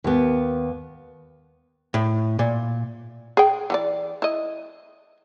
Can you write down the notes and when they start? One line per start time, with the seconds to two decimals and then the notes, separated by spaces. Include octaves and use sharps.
0.04 D#2 B3
1.94 A2
2.39 A#2
3.37 G#4 G5
3.70 E3 G4 D5
4.22 E4 D#5